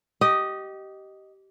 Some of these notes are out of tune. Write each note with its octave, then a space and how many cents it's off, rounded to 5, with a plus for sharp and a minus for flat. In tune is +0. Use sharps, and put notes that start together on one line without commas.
G4 -20 D#5 +0